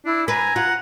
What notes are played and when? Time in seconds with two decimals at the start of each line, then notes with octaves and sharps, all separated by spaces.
0.05 D4 E4
0.28 B4 G#5 A#5
0.56 F4 F#5